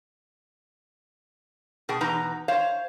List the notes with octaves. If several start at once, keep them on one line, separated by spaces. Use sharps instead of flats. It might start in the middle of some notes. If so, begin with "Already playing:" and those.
B2 G#4 G5
E2 B2 D#4 B4 A#5
C5 C#5 F5